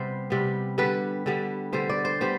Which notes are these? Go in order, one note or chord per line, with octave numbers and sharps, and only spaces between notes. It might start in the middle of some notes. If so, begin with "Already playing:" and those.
Already playing: C3 G3 B3 C5
C3 G3 B3
D3 G3 B3 B4
D3 G3 B3
D3 G3 B3 C5
D5
C5
G3 B3 C5